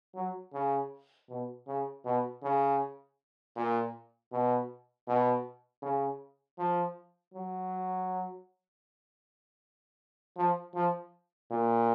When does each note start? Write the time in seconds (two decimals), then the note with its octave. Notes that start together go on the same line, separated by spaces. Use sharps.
0.15 F#3
0.53 C#3
1.29 B2
1.67 C#3
2.05 B2
2.42 C#3
3.56 A#2
4.32 B2
5.08 B2
5.82 C#3
6.58 F3
7.34 F#3
10.37 F3
10.75 F3
11.51 A#2